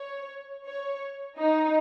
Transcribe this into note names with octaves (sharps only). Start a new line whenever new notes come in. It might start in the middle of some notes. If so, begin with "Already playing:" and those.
Already playing: C#5
C#5
D#4